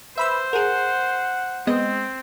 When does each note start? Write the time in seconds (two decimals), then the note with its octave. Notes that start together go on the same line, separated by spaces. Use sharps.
0.18 B4 C5 E5 B5 E6
0.53 G#4 A#4 F#5
1.67 G#3 B3 C4 D#5